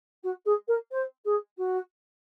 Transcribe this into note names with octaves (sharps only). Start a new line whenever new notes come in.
F#4
G#4
A#4
C5
G#4
F#4